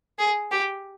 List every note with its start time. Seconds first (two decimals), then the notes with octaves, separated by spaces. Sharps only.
0.19 G#4
0.51 G4